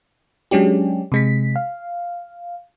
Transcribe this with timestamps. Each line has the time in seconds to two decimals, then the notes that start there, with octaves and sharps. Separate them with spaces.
0.51 F#3 G#3 C#4 D4 G4
1.12 C3 G#3 B6
1.56 F5